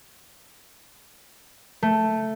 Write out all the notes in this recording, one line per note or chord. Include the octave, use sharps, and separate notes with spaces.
A3